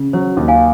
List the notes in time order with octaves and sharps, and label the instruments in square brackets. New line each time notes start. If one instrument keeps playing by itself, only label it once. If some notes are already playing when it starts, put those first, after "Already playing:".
Already playing: [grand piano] C#3
[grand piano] F#3 [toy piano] C5
[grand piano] D#2
[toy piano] F5 G#5